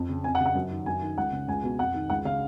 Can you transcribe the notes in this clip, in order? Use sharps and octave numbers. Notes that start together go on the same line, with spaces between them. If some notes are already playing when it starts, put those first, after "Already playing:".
Already playing: F2
C#3
F2 G#5
F#5
C#3
F#5
F#2
D#3
F#2 G#5
D#3
C#2 F#5
C#3
C#2 G#5
B2
F2 F#5
D#3
C#2 F#5
C#3 F5